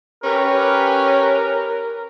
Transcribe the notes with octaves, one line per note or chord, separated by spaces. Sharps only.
C#4 G4 A#4 B4